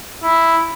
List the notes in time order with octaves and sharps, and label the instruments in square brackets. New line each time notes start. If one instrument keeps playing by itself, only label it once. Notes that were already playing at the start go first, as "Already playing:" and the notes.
[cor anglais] E4